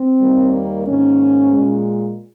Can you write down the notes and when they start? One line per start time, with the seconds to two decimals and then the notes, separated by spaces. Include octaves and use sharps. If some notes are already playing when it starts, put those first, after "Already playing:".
Already playing: C4
0.21 D#2 D#3 G3 A#3
0.87 G#2 D#3 A#3 C#4
1.54 A#2 G#3